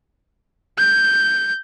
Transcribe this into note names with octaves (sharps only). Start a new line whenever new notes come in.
G6